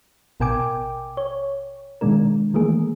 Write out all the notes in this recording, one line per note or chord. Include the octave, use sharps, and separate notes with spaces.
A1 B2 A#4 G5 G#5 D6
C#5
B2 D#3 G#3 D4 A#4
D#3 E3 A3 A#3 G#4